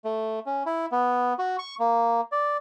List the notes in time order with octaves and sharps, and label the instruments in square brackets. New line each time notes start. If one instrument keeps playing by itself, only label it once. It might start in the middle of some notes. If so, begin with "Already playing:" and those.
[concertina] A3
C#4
E4
B3
F#4
C#6
A#3
D5